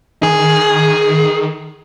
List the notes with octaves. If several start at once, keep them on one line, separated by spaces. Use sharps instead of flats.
D#3 G#4